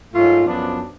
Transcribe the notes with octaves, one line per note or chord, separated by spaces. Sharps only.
G#2 F#3 A3 F4
F#2 F3 B3 D4